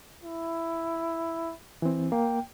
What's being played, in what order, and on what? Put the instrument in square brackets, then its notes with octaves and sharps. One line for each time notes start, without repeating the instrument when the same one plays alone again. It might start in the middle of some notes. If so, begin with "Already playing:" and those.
[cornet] E4
[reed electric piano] E3 C4
[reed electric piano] A#3 [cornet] G5